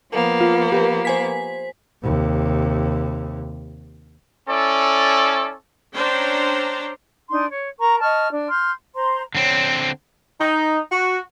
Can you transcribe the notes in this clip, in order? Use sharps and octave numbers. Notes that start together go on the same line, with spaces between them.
F3 A#3 B3
F4
G4 A#4 B4
C5 G#5 B6
D#2 C3
C#4 E4 A4 D5
C#4 D4 C5 G5 A#5
D4 D#4 C6
C#5
A#4 A#5 C#6
D#5 A5 C#6 F6
D4
C6 F6 G6
C5 A#5 C6
D3 C4 C#5
D#4
F#4